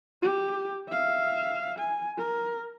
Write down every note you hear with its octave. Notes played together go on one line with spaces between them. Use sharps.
G4
E5 F5
G#5
A#4